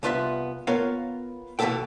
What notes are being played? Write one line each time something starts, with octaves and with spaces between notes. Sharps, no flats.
C2 B3 F4 B4 E5 C6
B3 F4 A#4 C#5 F5
B2 E3 F3 B3 A4 G5